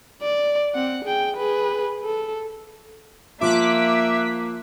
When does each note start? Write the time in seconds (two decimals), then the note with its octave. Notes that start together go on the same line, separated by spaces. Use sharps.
0.22 D5
0.75 C4 F#5
1.04 G#4 G5
1.37 G#4 B4
2.04 A4
3.41 F3 A#3 F4 E5 D6 F#6 B6